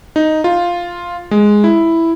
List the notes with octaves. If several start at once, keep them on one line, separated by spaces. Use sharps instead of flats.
D#4
F4
G#3
E4